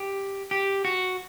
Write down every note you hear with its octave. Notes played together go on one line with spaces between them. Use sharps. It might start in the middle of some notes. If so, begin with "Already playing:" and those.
Already playing: G4
G4
F#4